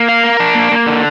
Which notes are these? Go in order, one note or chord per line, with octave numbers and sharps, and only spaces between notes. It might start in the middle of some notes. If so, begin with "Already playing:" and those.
Already playing: A#3
F5
A#4
D4
A#3
A#3
D3